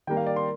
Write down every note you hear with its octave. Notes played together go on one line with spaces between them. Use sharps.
D#3 G3 A#3 G5
F5
D5
C6